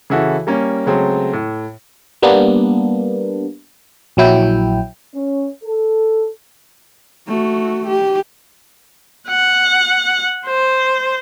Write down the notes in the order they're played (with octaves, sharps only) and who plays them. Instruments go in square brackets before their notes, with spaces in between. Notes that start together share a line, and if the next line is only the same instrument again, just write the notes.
[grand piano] C#3 E3 E4 F#4 A4
G3 A#3 C#4
C#3 F#3 G#3 A3 C4
A2
[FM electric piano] G3 A#3 B3 D4
A#1 F#3 E4 G5
[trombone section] C#4
A4
[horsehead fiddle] A3 F#4
G4
[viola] F#5
C5